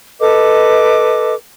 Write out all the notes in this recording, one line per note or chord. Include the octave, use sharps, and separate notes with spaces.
A4 B4 D#5 D6